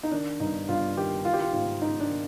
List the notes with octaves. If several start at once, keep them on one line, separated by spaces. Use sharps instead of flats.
D#4
D#3 D4
G2 D#4
G2 F4
D#3 G4
D#3 F4
G4
F4
G#2 F4
G#2 D#4
D4
D#3